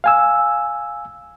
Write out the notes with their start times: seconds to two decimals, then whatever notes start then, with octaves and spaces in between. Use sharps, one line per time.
0.04 F5 G#5 E6